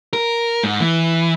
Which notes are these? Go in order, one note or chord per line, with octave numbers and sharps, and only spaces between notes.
A#4
G#2
E3